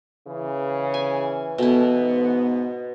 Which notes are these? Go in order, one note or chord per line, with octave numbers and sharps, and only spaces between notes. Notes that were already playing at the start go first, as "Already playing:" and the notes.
C#3 E3
G#5
B2 B3 E4 A4
G#2